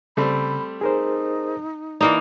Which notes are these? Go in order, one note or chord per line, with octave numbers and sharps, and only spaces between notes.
C#3 G3 A3 C4 B5
D#4 G#4 A#4 C5
E3 A#3 D#4 D5